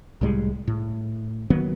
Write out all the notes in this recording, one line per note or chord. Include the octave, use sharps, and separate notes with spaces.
C2 A2 G3 G#3
A2
D#3 F#3 A#3 B3